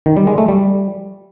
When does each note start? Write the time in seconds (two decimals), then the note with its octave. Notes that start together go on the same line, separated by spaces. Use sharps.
0.06 D#3
0.17 G3
0.27 G#3
0.38 A3
0.48 G3